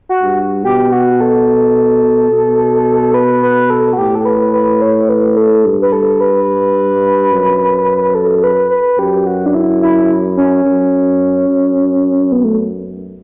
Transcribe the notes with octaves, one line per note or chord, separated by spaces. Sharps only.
F#4
G2
B2 G4
F#4
A4
B2
B4
B4
A4
F#4
A2 G4
A4
B4
B4
C#5
B4
A4
G2
B4
A4
B4
F#2
A4
B4
B4
F#2 G4
F#4
D4
E4
E4
C#4
F#2
F#2
B3
A3